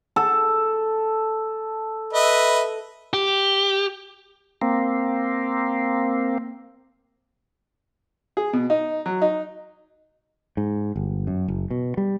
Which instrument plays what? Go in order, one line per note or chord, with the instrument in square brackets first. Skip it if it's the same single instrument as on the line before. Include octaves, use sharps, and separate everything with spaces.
[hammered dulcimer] A4
[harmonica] B4 D#5 E5
[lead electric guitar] G4
[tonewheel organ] A#3 C4
[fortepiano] G#4
B2
D#4
F#3
D#4
[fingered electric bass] G#2
G1
F#2
F#1
B2
G3